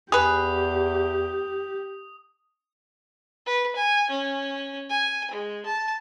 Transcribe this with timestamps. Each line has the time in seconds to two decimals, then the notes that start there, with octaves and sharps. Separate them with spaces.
0.12 E2 G4 G#4 B4 D#6
3.46 B4
3.76 G#5
4.10 C#4
4.89 G#5
5.31 G#3
5.65 A5